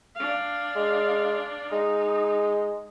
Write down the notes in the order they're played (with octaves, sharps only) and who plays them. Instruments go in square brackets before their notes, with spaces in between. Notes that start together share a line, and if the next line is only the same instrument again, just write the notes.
[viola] D4 F5
[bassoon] G#3
[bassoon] G#3 [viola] D#4